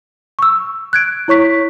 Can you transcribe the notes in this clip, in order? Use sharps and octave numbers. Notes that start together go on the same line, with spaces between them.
C#6 E6
F#6 G#6 D7
E4 C#5 C#6 B6